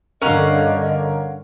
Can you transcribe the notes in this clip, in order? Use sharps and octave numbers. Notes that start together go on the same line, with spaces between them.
G2 D3 C#4 A#4 D#5 F5 F#5